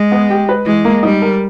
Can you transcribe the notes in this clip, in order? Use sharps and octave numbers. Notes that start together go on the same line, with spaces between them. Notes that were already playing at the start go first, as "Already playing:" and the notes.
Already playing: G#3
B3
G4
B4
E3 G#3
A#3
G3 D#4
A#4